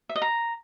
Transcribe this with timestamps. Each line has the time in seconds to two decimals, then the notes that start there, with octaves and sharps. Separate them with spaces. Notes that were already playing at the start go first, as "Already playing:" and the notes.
0.09 E5
0.16 D#5
0.22 A#5